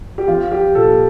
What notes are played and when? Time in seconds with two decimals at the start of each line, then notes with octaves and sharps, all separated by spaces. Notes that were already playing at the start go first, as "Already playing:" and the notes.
0.18 G4
0.28 F3 F4
0.52 G4
0.75 A#2 A4